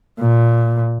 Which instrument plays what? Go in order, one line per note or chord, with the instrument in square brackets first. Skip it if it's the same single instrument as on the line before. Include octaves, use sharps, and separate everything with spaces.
[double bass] A#2